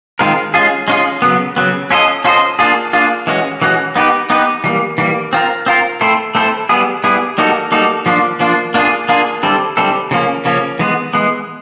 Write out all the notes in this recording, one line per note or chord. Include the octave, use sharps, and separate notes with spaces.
D#3 G#3 C4 F4 A#4
G#3 C#4 F4 G#4
G#3 C#4 F4 G#4
C#3 F#3 B3
C#3 F#3 B3
C#4 F4 A4 C5 D#5
C#4 F4 A4 C5 D#5
A#3 D4 F4 G#4
A#3 D4 F4 G#4
E3 G#3 C#4 F#4
E3 G#3 C#4 F#4
B3 D#4 G4 B4
B3 D#4 G4 B4
E3 G3 A#3
E3 G3 A#3
C4 F4 A#4
C4 F4 A#4
A3 C4 E4 A4 C5
A3 C4 E4 A4 C5
G3 B3 E4 G#4
G3 B3 E4 G#4
G3 A#3 D#4 F#4 A4
G3 A#3 D#4 F#4 A4
F3 A#3 D4 F4
F3 A#3 D4 F4
A#3 D4 F4 G#4
A#3 D4 F4 G#4
D3 G3 C4 E4 A4
D3 G3 C4 E4 A4
C#3 F3 A#3 C#4
C#3 F3 A#3 C#4
E3 G#3 B3
E3 G#3 B3